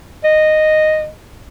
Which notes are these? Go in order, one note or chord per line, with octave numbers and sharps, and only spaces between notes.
D#5